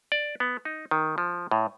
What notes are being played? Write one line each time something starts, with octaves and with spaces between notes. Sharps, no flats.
D5
B3
D#4
D#3
F3
A2